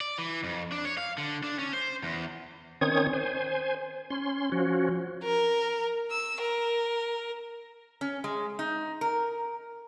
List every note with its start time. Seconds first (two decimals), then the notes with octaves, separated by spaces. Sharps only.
0.01 D5
0.18 E3
0.44 F2
0.72 D4
0.85 C#5
0.98 F5
1.18 D3
1.43 D4
1.59 C#4
1.73 C5
2.03 E2
2.81 D#3 C4 C#4 C#5 D#6 G#6
3.13 C5 G#5
4.10 C#4 C6
4.52 F3 C#4 F#4
5.23 A#4
6.11 E6
6.40 A#4
8.01 C#4
8.24 G#3
8.59 D#4
9.01 A#4